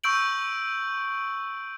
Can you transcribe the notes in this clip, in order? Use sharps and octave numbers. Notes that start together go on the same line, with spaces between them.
C#6 E6 G6 D7 F#7